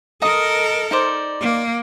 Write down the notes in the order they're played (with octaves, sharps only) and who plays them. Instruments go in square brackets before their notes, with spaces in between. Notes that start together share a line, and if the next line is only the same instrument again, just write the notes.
[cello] A4 A#4 [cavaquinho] D#5 A#5
[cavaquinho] D#4 C5 D5
[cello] A#3